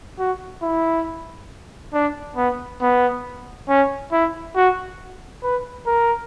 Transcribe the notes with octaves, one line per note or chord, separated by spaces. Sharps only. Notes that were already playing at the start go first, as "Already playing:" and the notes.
F#4
E4
D4
B3
B3
C#4
E4
F#4
B4
A#4